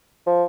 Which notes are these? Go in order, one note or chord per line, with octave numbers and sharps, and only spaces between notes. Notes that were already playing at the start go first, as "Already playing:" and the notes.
F3